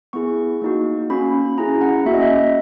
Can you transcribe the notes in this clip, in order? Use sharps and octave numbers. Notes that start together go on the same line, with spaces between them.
B3 E4 G#4 C#6
A#3 D#4 F#4
A#3 C#4 F#4 B5
C#4 E4 G#4 A#5
F#5
A#3 C#4 F#4 E5
D#5
E5